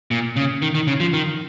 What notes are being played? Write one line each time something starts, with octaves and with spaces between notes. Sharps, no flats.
A#2
C#3
D#3
D#3
C#3
F3
D#3